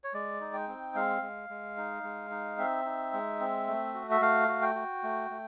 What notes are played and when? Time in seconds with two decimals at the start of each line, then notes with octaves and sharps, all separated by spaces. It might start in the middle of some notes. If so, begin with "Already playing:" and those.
0.04 C#5
0.14 G#3 D5
0.40 D#4
0.54 G5
0.68 C4
0.95 G#3 F5
1.22 G#3
1.50 G#3
1.77 D#4
2.03 G#3
2.31 D#4
2.58 C4 E5
2.85 D#4
3.13 G#3
3.40 C4
3.68 A3
3.94 F#4
4.11 E5
4.21 A3 F5
4.48 F#4
4.62 G5
4.75 F#4
5.03 A3
5.30 A3